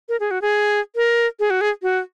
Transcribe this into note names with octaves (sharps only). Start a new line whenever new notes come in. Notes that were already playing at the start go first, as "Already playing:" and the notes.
A#4
G#4
F#4
G#4
A#4
G#4
F#4
G#4
F#4